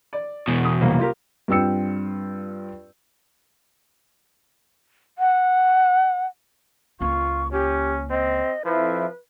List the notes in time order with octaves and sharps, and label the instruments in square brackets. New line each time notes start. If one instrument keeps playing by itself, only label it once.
[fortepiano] D5
[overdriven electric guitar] E2 B2
[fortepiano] D#6
C2 F#3 A#3
F4 G4 A#4
[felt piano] G2 C4 F4 G5 E6 C#7
[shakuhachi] F#5
[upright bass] C#2 A#3 [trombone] F4 [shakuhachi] C#6
[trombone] C#4 [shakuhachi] G4
[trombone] C4 [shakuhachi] D#5
[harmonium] F2 E4 [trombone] F3 [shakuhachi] B4